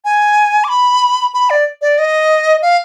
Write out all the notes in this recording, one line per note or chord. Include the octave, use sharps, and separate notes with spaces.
G#5
D6
B5
B5
D5
D5
D#5
F5